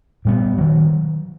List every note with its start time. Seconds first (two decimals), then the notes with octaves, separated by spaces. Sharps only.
0.25 A#2 G3 B3
0.58 D#3 F#3